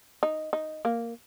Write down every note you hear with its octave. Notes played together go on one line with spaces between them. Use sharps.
D#4
D#4
A#3